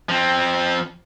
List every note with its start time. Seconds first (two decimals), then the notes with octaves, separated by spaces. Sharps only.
0.09 F3 C4